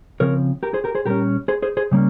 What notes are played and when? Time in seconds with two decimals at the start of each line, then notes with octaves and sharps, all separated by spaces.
0.20 C#3 F3 C4 A#4 C#5
0.63 G4 A#4
0.74 G#4 C5
0.84 G4 A#4
0.95 G#4 C5
1.06 A#2 G3 C#4 G4 A#4
1.48 G#4 C5
1.62 G#4 C5
1.77 G#4 C5
1.91 C#3 G3 A#3 C#4